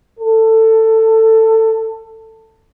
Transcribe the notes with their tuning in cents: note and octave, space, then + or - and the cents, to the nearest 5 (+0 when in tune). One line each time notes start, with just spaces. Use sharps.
A4 +15